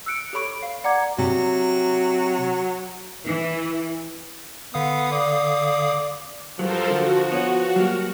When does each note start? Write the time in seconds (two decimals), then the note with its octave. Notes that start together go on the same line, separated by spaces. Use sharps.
0.06 E6 F#6 C#7 D7
0.33 G4 A4 C#5 B5 C#6 D7
0.63 F5
0.84 D5 F#5 A#5 D6 G#6
1.18 C3 F#3
3.26 E3
4.74 D3 B3 F5 D#6
5.11 D5
6.59 G2 F3 F#3 A4 A#4 C5
6.90 D3 F#4
7.32 B3 C#5
7.76 F#3 G3 A#3